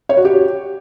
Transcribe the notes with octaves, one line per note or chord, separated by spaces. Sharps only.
C#5
F#4
G4